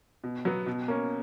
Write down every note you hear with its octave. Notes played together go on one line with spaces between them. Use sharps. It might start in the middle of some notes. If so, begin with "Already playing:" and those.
B2
F#3 B3
B2
A#3 C#4